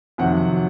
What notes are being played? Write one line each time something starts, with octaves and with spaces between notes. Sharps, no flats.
F2 C3 D#3 F#3 F#5